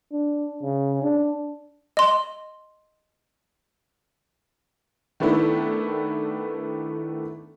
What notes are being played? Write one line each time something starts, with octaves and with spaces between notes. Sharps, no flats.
D4
C#3
D4
D#5 C6
D#3 A3 B3 D4 E4